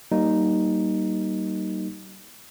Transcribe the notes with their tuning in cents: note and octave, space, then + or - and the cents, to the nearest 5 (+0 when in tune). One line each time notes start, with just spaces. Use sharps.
G3 -35 A#3 +0 D#4 +0